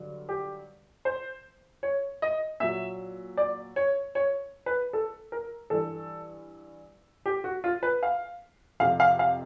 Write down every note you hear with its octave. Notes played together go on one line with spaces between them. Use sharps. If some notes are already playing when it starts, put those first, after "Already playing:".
Already playing: G2 D3 F#3
G4
C5
C#5
D#5
A#2 F#3 E5
D5
C#5
C#5
B4
A4
A#4
G2 E3 A4
G4
F#4
F4
B4
F5
F2 C3 F3 F5
F5
F5